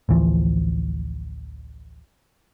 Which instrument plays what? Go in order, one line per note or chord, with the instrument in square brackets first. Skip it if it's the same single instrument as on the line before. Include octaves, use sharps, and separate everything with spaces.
[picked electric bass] A1 D2 E3 F3